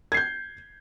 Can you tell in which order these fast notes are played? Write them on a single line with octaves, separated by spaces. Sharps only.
G#6 C7 G6